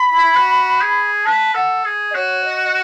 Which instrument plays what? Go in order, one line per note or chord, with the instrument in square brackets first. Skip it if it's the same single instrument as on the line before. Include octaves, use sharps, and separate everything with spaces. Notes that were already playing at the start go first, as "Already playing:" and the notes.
Already playing: [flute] B5
[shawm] E4
F#4
G#4
[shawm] B4 [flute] A5
[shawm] A4 [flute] F#5
[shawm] G#4
[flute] D#5
[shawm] F#4 [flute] C#5
[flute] D#5
D#5